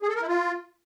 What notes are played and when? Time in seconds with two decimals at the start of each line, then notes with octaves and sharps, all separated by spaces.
0.02 G#4
0.09 A4
0.15 A#4
0.22 E4
0.28 F4